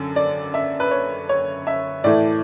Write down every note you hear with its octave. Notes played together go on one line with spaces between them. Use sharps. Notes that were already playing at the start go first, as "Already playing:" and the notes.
Already playing: F#2 D3
D5
E5
B4
C#5
C#5
E5
A2 E3 A3 D5